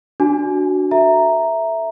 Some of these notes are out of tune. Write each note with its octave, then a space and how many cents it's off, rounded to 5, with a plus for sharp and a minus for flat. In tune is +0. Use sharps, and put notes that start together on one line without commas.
D4 +0 F#4 +0 G#5 +25
A4 +0 E5 +0 A#5 +0